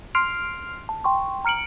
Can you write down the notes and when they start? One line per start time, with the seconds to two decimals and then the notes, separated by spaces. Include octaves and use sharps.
0.15 C6 F6 C7 D7 F7
0.89 A5
1.04 G5 C6 C#6
1.45 A#5 F6 C#7 D7 F#7